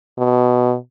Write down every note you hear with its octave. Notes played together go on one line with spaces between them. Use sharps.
B2